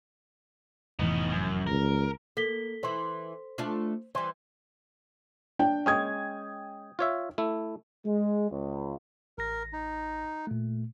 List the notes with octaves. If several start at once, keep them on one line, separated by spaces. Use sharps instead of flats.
F1 A2 E3 B3 D#4
F#2
C#2 A#4
A#3 A4 B6 G7
E3 E4 C5
A3 D4 F4
E3 G3 C5
D4 G5
G#3 C#4 G5 D#6 G#6
F4 C#5 E5
A3 E4
G#3
C#2
A1 A#4 A#6
D#4
A#2 A3